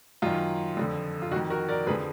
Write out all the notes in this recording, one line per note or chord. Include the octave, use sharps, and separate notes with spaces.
F#2 D#3 F4
F2 D3 F3
F4
F2 D#3 F#4
F#4 A#4
A#4 D5
F2 D3 F3 G#4 B4